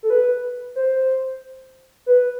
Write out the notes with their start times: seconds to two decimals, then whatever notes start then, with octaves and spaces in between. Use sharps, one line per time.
0.03 A4
0.10 B4
0.76 C5
2.06 B4